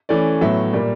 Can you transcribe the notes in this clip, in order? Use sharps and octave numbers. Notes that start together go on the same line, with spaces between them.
E3 A3 C#4 D5
A2 F#3 B3 E5
A#2 G3 A#3